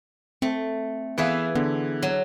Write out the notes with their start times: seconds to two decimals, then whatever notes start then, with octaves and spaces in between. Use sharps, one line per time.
0.42 A3 C4
1.18 E3 B3 G#4 B4 E5 F5
1.55 D3 B3
2.03 F#3